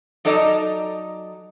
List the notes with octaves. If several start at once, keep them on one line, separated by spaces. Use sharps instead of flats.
F#3 D#4 A4 D5 D#5 A#5